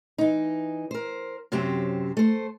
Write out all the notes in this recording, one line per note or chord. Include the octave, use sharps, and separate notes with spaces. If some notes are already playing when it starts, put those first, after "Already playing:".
E3 D#4
A#4 C5
F#2 C3 F#3 C4 G4
A3 C5